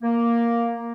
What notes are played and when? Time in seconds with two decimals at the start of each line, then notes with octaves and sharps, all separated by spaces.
0.03 A#3